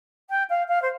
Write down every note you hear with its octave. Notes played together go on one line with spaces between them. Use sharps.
G5
F5
F5
C5